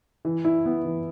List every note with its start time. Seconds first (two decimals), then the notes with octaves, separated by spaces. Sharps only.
0.25 E3
0.45 E4
0.66 B3
0.85 E3